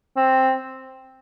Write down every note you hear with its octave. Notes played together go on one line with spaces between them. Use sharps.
C4